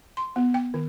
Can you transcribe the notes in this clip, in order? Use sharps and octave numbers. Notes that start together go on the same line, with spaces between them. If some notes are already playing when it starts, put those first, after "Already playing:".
C6
B3
G5
D#3